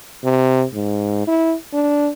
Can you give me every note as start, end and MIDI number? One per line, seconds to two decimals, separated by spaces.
0.24 0.65 48
0.74 1.22 44
1.27 1.55 64
1.73 2.10 62